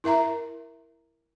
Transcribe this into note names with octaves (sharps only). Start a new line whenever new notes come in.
E4 A#4 E5 A#5